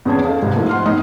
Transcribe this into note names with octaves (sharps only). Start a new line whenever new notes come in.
E2 C#3 G#4 A5 G#6
A4 D#5 F5
C2 C3
F3 A3 A#3 D#4 E4
F#5 C6 F6
G1 A2 D#4 D#5